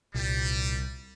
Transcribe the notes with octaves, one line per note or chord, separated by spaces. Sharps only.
C2 A#2 G3